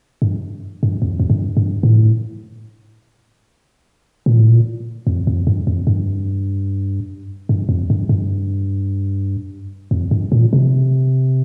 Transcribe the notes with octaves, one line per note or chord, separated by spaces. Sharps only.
G2
G2
F2
F2
G2
G2
A2
A#2
A2
A#2
F2
F2
G2
F2
G2
G2
F2
G2
G2
F2
G2
A#2
C3